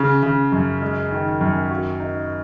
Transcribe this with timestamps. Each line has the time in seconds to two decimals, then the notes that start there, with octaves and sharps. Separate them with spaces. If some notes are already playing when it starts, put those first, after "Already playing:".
Already playing: C#3
0.23 C#3
0.52 F#2
0.81 G#3
1.11 D#3
1.41 F#2
1.71 F#4
2.00 D#4